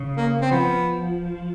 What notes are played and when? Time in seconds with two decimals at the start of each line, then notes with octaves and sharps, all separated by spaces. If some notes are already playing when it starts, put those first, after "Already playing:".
Already playing: C#3
0.17 A#3
0.41 C4
0.51 F3 B3